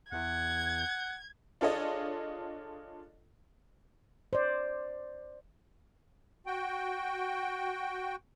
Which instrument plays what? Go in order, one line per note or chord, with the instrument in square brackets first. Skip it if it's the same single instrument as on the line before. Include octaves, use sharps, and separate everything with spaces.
[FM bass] E2 [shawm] F#5 [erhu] G#6
[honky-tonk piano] D4 F4 G#4 A4 C#5 D#5
[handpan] C5 D5
[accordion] F#4 G5